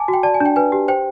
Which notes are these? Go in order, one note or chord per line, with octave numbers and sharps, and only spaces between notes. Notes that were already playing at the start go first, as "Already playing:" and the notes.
Already playing: G#5 A5 D6
F#4
G5
D5 A5
G#5
D4 G5
B4 G#5
G4
C5 G5